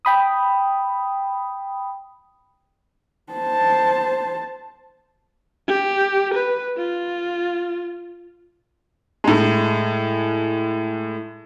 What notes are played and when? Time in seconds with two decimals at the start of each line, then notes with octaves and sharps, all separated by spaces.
0.05 G5 B5 D#6
3.33 C5 A5
5.68 G4
6.34 B4
6.77 F4
9.24 A2 G#3